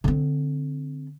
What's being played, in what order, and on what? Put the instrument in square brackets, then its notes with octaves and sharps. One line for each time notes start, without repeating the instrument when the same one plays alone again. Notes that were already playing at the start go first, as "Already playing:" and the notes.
[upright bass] D3 C4